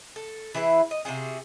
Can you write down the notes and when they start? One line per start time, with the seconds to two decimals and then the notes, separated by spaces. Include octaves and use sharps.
0.16 A4
0.54 E3 E4 G#4 B4
0.91 D#5
1.05 C3 F4 F#4 G#4